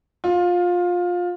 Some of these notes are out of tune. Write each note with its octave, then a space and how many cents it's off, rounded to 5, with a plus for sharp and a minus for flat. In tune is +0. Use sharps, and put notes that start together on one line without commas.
F4 +20